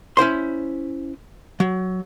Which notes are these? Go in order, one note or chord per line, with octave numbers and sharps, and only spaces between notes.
C#4 E4 C5 C6
F#3